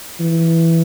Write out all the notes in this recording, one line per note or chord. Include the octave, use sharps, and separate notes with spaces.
E3